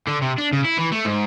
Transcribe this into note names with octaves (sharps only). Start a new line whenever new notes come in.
D3
C3
D4
C#3
E4
E3
A3
G#2